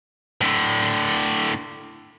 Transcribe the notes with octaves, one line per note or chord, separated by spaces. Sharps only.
A2 D3